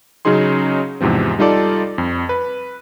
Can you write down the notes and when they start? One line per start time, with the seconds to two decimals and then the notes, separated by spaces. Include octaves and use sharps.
0.25 C#3 F#3 C#4 D#4 G#4 C6
1.01 E2 G#2 C3 F3 C4
1.39 G3 D#4 F4 A4 D5
1.98 F2
2.29 B4